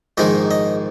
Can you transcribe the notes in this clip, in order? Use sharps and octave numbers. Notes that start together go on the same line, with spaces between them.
A#1 G#2 D#3 G#3 D#4 D#5
D#5